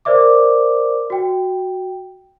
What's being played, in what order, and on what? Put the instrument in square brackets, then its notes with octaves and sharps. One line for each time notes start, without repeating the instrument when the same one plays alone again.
[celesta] A#4 C5 D5 E5 D6
F#4 G5